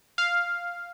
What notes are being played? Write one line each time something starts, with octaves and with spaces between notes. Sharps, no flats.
F5